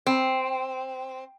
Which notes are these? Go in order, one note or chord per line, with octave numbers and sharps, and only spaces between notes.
C4